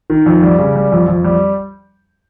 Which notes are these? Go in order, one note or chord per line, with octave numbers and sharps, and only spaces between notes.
D#3
F2
G3
C#3
G3
F2
F2
G3